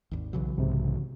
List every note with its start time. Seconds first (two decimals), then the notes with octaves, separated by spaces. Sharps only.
0.11 G#1 D#2
0.33 B1 C#3 E3 F#3
0.58 B1 G#2 C3